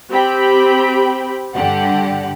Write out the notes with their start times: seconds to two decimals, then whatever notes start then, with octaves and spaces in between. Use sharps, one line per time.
0.10 C4 G4 G5 B5
1.55 G2 D3 G4 F#5